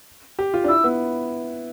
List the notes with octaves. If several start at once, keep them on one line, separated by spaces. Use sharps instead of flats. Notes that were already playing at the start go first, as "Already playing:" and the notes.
G4
F4
D4
E4 E6
B3